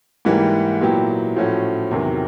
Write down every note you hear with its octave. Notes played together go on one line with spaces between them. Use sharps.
G#2 E3 G3 A#3
A#2 F#3 B3 E4 G4
A2 F3 A3 C#4 F#4
E2 C3 D#3 F#3